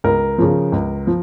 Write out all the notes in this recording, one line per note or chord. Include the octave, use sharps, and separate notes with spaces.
C#2 A#4
C#3 F3
C#2
F3